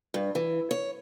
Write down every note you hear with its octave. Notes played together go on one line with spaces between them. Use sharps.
G2
E3
C#5